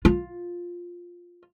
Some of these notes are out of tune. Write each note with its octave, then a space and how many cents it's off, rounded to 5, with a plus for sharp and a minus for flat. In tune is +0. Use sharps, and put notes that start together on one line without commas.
F4 +5